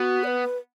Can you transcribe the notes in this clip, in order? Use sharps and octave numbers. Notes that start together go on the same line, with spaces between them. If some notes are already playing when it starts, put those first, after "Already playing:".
Already playing: B3 F#4
D5
B4